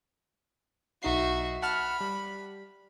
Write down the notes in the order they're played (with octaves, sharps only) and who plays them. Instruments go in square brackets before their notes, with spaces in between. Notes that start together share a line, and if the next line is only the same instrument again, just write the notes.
[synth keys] B1 D#4 C7 [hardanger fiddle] F#4 E5
[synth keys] F#5 A5 F6 [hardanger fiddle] B5
[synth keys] G3